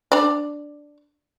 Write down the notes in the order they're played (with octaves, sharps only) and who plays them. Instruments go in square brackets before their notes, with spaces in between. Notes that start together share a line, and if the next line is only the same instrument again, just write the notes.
[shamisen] D4 D5